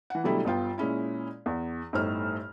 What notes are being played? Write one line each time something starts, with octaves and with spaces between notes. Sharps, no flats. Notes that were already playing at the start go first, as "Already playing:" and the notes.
E3 F#5
B2 D3 F#3 G3 A3 E4
G1 B3 F4 G5
A#2 G#3 C#4 E4
E2
G1 A2 D#4 C5 F6